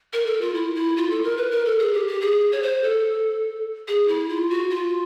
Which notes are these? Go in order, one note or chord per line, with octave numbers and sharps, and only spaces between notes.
A#4
A4
F4
E4
E4
F4
A4
A#4
B4
A#4
A4
G#4
G4
G4
G#4
C#5
C5
A4
G#4
E4
F4
F#4
F4